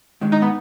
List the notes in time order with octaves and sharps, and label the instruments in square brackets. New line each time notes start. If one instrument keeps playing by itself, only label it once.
[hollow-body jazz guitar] G#2 D#3 G#3
[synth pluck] D#4
B3